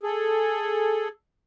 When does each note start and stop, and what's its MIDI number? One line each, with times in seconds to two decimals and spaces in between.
0.03 1.08 68
0.03 1.08 69